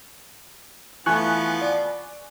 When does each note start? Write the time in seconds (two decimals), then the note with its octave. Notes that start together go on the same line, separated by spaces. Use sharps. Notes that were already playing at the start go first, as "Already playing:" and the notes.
1.06 E3 F3 A3 B3 G#5 C#6 F#6
1.61 D5